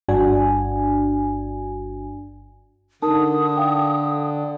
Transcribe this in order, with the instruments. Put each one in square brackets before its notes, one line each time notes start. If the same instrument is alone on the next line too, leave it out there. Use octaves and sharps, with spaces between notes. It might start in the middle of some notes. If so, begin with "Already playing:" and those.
[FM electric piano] G1 G2 D4 F#4 G#5
[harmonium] D3 [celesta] D#4 A#4 A5 [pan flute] D#6
[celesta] F5 G5